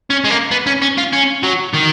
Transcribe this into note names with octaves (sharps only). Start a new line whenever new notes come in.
C#4
G#3
A#3
B3
C#4
C#4
F4
C#4
F#3
D#3